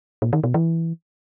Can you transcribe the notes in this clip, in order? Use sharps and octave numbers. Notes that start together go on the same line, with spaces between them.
A#2
D#3
B2
E3